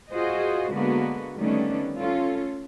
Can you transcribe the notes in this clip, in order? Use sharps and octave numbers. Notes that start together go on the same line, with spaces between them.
F4 F#4 G#4 C5 D#5
D3 G#3 A#3 B3 F#4
D#3 G3 A3 B3 C#4 D4
C#4 F4 A4